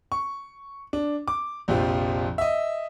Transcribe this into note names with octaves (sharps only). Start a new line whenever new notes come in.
C#6
D4
D6
A#1 F2 C3 F3
D#5 E5